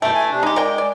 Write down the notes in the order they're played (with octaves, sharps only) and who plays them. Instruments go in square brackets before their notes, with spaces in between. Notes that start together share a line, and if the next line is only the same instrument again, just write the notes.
[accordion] F#2 B2 G5 [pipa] E3 A3
[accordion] G#5
C3 D4
[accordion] G#3 [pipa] D#4 G4
[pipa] A#4 D5 G5
D5